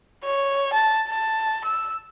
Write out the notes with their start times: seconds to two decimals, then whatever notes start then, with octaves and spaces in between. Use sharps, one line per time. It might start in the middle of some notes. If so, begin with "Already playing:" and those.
0.23 C#5
0.73 A5
1.08 A5
1.64 E6